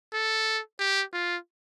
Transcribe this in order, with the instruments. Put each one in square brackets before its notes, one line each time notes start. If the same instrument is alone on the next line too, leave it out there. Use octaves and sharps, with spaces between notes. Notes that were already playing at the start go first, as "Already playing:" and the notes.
[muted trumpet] A4
G4
F4